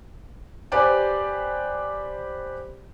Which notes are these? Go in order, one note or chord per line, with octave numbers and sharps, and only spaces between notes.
G4 B4 C5 D5 G#5